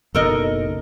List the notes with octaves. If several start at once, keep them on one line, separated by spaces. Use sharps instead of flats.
F#1 B1 A4 A#4 D#5